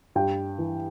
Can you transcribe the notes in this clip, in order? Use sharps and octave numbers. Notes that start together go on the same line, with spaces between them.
G2 G5
E3